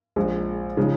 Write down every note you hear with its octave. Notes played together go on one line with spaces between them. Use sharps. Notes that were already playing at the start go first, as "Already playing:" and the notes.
A#1 A#2 G#3
C#3 F3 G#3 D#4